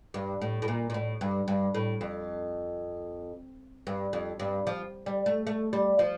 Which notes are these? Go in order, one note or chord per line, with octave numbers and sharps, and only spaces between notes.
G2
A2
A2
A#2
A#2
A2
G2
G2
A2
F2
G2
F2
G2
F3
G3
A3
A3
G3
F3